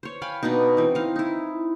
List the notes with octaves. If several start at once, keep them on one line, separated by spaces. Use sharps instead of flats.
C5 C#5
F5 G5 G#5 B5
B2 B3 D4 D#4
E3 C4
D#4 F5
D#4 E4